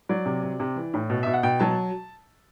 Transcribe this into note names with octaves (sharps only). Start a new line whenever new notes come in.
F#3 D5
C3
C3
C3
E3
A2
B2
B2 E5
F#5
B2 G5
F#3 A5